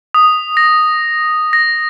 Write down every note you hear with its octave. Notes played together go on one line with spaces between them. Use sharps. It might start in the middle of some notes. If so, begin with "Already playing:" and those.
D#6
A#6
A#6